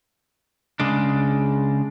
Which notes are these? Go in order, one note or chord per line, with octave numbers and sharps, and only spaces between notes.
C#3 G#3 D4